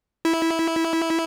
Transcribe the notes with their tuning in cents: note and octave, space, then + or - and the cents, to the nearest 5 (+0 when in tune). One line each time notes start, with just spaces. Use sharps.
E4 -10